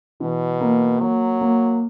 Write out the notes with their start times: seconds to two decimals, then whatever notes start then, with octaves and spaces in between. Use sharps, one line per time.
0.21 B2 E3
0.61 A#3
1.00 F#3 A#3
1.41 A#3